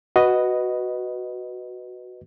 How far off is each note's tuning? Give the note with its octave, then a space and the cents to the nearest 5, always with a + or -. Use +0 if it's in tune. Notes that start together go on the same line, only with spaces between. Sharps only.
F#4 +0 B4 +0 D#5 +0